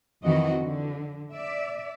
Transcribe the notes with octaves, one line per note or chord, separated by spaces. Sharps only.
F2 D#3 E3 C4 F#4 D#5
D3
D5 E5